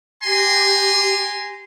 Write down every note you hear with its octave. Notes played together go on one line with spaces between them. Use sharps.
G4 G#5 A#5 C6